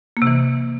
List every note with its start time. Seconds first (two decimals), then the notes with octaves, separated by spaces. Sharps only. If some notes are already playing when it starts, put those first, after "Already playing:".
0.17 A#3
0.22 C3
0.27 E3